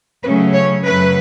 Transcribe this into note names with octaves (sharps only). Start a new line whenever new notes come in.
C#3 F#3 A3 C#4 B4
C#5
F#2 C#3 F#3 A3 B4